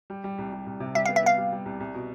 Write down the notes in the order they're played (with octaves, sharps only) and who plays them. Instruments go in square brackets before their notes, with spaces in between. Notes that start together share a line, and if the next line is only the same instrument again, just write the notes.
[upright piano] G3
G3
C2
G3
C2
C3
[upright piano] G3 [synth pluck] E5
[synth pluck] F5
[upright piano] B3
[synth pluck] E5
[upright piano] B3 [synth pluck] F5
[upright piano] G3
G3
C2
C2
B2